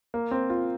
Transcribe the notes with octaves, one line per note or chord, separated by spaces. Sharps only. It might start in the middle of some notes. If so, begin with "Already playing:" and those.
A#3
C4
F4